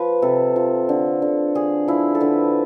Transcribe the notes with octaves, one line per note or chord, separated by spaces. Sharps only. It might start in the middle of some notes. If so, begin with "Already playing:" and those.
Already playing: F3 B4
C3 A4
F3
D3
D3
D3 G#4
F3 E4
A4
D3 B4